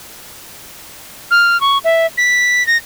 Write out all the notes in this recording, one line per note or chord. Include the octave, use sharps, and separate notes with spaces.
F6
C#6
E5
B6
A#6